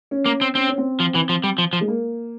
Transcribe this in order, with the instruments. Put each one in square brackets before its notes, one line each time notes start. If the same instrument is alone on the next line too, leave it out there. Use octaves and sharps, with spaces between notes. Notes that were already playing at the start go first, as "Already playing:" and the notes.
[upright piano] C#4
[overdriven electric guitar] A#3
C4
[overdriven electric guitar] C4 [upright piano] C#4
[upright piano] C#4
C4
[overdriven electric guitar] F3
E3
F3
G3
F3
F3
[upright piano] G#3
A#3